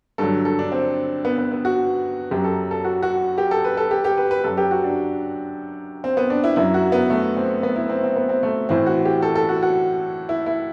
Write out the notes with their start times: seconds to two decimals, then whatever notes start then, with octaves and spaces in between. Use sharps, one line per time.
0.18 G2 D3 F#3 A4
0.45 A4
0.59 D4
0.72 C4
1.25 B3
1.38 B3
1.52 B3
1.65 F#4
2.31 F#2 F#3 G4
2.44 A4
2.71 A4
2.85 F#4
3.03 F#4
3.38 G4
3.51 A4
3.64 B4
3.77 A4
3.91 G4
4.04 G4
4.17 B4
4.31 B4
4.44 F#2 F#3 A4
4.57 G4
4.71 F#4
4.84 D4
6.04 C4
6.17 B3
6.30 D4
6.44 E4
6.56 F#2 F#3 E4
6.74 F#4
6.92 B3
7.10 A3
7.37 C4
7.63 B3
7.76 E4
7.89 C4
8.03 C4
8.16 B3
8.29 C4
8.43 A3
8.69 A2 E3 C4
8.86 F#4
9.05 G4
9.22 A4
9.35 A4
9.49 F#4
9.63 F#4
10.29 E4
10.46 E4